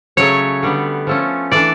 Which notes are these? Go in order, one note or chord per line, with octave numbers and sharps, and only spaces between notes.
C#3 F#3 A3 C#5
D3 G3 B3
F3 A3 C#4
E3 A3 D4 D5